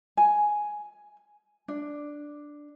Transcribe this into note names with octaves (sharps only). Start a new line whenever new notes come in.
G#5
D4